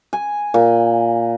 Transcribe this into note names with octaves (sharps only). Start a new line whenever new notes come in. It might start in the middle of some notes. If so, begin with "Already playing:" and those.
G#5
A#2